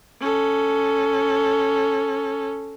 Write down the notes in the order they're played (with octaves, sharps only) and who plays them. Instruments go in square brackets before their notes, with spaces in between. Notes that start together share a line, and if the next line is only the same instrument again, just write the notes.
[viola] C#4 A4